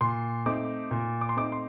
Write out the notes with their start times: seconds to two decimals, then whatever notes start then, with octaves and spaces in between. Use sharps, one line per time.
0.01 A#2 C6
0.46 A3 C4 D#4 D6
0.91 A#2
1.21 D6
1.29 C6
1.37 A3 C4 D#4 D6
1.52 C6